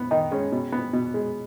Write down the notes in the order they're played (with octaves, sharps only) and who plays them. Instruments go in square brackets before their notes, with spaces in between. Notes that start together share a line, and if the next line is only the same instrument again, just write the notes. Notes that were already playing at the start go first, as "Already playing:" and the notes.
Already playing: [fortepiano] B3
D#3 D#4
G#3 C#4
B2
B3
B2
G#3